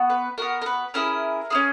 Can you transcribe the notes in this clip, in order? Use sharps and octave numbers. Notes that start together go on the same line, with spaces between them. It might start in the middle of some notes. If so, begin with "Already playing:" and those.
Already playing: B3 F#4
B4
B3 F#4 A#4
A#4
B4
C#4 E4 G#4 A#4
C#4 E4 G#4